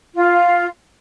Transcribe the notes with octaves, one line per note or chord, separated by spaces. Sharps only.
F4